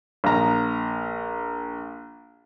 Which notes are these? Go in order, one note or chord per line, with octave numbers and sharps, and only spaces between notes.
A#1 A#5